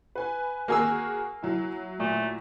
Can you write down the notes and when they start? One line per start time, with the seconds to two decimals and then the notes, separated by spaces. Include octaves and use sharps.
0.16 B4 G#5
0.68 A#3 F#4 G#4 A#4 G#5 E6
1.43 F#3 E4
2.00 A#2 A3